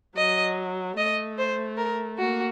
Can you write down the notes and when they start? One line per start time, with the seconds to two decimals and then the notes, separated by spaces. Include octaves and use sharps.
0.16 F#3 D#5
0.97 A3 D#5
1.38 C5
1.77 A#4
2.19 A#3 F#4